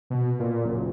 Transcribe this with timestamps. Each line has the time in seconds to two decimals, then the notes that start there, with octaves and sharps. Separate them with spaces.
0.10 B2
0.39 A#2
0.65 F#1